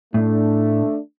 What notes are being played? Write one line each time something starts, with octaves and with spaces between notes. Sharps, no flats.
A2 A3 D4